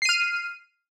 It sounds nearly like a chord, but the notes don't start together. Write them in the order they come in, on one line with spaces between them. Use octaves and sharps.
C7 D#7 F6